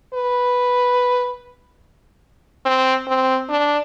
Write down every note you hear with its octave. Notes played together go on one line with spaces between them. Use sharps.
B4
C4
C4
D4